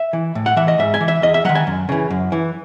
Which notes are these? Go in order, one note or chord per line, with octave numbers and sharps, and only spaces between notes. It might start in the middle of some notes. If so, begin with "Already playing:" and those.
Already playing: E5
E3
A2
F#5
E3 E5
D#5
G#2 E5
G#5
E3
E5
E2 D#5
E5
D#3 F#3 F#5
G#5
F#2
C#3 E3
F#2
E3